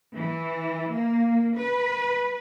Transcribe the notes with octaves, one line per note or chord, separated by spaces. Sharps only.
E3
A#3
B4